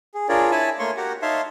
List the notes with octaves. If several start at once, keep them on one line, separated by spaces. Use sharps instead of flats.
G#4
D4 F4 G#4 A#4 C#5 D5
E4 C#5 G#5 A5 B5
A3 A#3 C#5 C6 C#6
F#4 G4 A#4 F#5
D#4 C#5 E5 F5 A5 C6